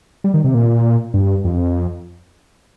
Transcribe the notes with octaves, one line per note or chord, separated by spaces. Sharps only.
G3
D#3
C3
A#2
G2
F2